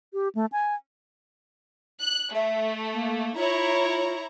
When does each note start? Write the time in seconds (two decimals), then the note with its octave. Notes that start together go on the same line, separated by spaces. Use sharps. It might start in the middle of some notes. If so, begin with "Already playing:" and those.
0.13 G4
0.35 A3
0.52 G#5
1.99 F#6
2.35 A3 E5
2.93 A#3
3.36 E4 F4 C#5 A#5